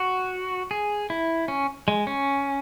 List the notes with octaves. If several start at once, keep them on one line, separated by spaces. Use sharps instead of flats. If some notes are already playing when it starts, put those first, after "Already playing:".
Already playing: F#4
G#4
E4
C#4
G#3
C#4